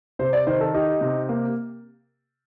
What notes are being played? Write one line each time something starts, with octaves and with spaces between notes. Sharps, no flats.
C3 C5
D5
D#3 C5
A4
D#4 G4
C3
A#3